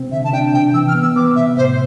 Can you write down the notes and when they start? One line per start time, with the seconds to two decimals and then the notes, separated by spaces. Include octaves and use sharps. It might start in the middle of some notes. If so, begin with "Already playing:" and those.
Already playing: C3 C4
0.11 D3 E5
0.24 A5
0.33 D4 G5
0.54 C3 G5
0.74 E3 E6
0.88 F6
0.94 B3
1.02 E6
1.16 B3 D6
1.36 C3 E5
1.57 A2 C5